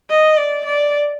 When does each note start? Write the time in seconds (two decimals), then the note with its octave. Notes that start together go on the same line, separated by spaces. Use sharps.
0.10 D#5
0.37 D5
0.65 D5